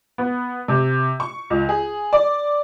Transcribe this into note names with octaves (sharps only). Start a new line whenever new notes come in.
B3
C3
C#6
C#2
G#4
D5